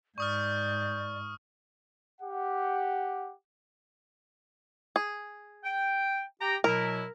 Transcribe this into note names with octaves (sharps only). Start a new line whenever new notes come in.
G#2 D5 C#6 D#6 F6 G6
G4 F#5
G#4
G5
G4 G5 A#5
B2 F#3 E4 A#4